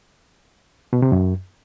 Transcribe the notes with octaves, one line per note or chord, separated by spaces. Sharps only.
B2
C3
F#2